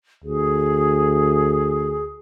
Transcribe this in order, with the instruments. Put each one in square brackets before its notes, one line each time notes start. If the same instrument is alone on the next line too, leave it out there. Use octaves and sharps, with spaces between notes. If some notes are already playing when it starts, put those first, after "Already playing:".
[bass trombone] D2 [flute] G#4